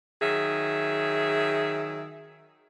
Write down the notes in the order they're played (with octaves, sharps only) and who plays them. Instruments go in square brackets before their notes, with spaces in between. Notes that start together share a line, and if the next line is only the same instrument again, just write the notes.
[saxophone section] D#3 F#3 G#4 E5